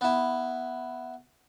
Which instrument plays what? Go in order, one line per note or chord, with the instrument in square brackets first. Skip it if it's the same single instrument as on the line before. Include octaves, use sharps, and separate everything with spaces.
[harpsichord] B3 E4